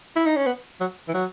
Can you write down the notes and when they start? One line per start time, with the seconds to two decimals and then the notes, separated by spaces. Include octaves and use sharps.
0.16 E4
0.26 D#4
0.36 C#4
0.46 B3
0.80 F#3
1.08 E3
1.14 F#3